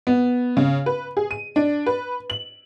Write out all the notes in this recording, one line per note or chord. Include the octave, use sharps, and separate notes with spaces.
B3
C#3
B4
G#4
D#7
D4
B4
F#7